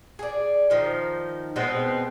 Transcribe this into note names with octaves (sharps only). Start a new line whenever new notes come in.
G#4 D5
D#3 F3 D#4
B2 G#3 B3 C4